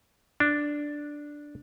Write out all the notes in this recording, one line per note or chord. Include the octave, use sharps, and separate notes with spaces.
D4